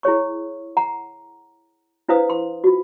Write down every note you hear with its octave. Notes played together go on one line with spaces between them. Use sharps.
E4 G#4 C#5 C#6
F#5 A#5
D4 E4 B4 C5 F5 D#6
C6
F4 F#4